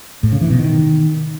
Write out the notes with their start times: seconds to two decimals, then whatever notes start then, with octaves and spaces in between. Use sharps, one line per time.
0.23 A2
0.32 C#3
0.41 E3
0.50 B2
0.59 D#3